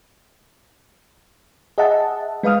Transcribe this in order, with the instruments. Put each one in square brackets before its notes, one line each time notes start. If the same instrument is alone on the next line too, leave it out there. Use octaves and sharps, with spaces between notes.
[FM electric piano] G#4 D#5 E5 F#5 A5
G#3 B4 F5 D#6 F6